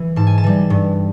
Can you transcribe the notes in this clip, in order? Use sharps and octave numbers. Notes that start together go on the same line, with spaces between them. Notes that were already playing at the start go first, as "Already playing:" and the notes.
Already playing: E3
G#2 A5
G#5
A5
E3 G3
G2